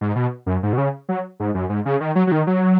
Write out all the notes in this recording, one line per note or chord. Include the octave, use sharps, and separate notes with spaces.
G#2
B2
F#2
G#2
B2
C#3
F#3
G#2
F#2
G#2
C#3
D#3
F#3
F#3
D#3
F#3